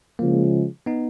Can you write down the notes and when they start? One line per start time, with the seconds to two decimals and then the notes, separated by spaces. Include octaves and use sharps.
0.19 C#3 F3 G#3 A#3
0.86 B3 D#4